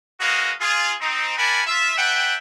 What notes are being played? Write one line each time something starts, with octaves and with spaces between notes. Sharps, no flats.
A#3 F#4 G#4 B4 D#5 F5
F4 G#4
C4 D#4
A#4 D5 F#5 G#5 A5 B5
F4 E5
D4 B4 E5 F#5 G5